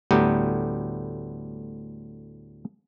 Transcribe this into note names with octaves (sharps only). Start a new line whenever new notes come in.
D2 A2 G3 B3 G4 A#5